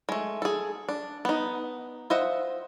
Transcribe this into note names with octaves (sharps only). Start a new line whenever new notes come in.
G#3 A3
G#4 A4
D4
B3 D#4
F4 C5 D#5 E5 F#5